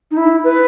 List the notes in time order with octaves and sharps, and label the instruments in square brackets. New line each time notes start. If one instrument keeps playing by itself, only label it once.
[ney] D#4
E4
B4